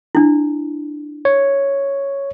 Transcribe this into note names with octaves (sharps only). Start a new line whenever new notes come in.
D4 E4
C#5